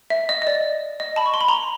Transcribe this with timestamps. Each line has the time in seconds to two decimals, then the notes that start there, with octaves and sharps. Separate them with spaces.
0.10 E5
0.29 D#5
0.42 D#5
0.47 D5
1.00 D#5
1.16 A5 B5
1.26 C#6
1.34 C6
1.41 B5
1.48 A#5 C6